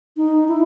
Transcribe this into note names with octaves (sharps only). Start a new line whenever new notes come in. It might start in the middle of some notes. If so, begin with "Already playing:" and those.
D#4
E4